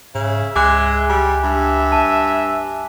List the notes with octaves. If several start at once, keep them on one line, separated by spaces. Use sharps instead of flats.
G#2 C#3 E5
C#2 G#3 G#5 D6 F#6
G3
G2 E5
A5